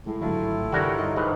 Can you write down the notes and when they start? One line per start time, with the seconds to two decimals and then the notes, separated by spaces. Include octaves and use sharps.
0.06 A2 G#3
0.21 G#1 D3 F#3 A3 E4 F4
0.72 G2 D3 E3 G3 F#4 A#4 C#5
0.98 D#4
1.16 G#2 D#3 D#4 B4